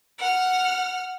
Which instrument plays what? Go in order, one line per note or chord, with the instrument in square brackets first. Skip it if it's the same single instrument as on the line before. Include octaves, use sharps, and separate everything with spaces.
[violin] F#5 F6